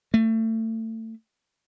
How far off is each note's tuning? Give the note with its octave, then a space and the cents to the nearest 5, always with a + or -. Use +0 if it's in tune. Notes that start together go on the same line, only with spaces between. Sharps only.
A3 +25